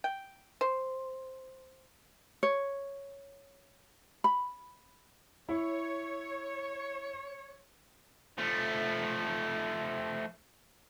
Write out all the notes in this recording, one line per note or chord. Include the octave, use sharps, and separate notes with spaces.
G5
C5
C#5
B5
E4 C#5
F3 A3